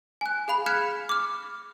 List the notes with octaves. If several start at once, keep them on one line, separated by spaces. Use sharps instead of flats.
G#5 F#6
G#4 F5 B5 F7
F6 F#6 G#6 B6 C#7 E7
D6 F6